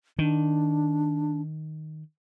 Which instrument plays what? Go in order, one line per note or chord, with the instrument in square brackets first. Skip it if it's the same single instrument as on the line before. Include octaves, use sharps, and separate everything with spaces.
[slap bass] D#3 [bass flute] D4